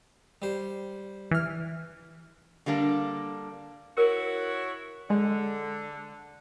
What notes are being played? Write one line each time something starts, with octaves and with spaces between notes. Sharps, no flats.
G3 C5
E3 F6
D3 G3 A#3 D4
E4 F#4 A#4 C#5
D3 G#3